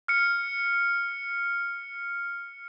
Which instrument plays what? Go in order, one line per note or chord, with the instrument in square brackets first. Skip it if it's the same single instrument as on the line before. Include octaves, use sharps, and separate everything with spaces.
[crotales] F6 C#7